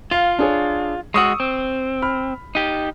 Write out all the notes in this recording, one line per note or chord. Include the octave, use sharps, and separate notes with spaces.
F4 F5
D4 G#4 C#5
G#3 F#4 C#6 D#6 E6
C4
B5 F6
D#4 G4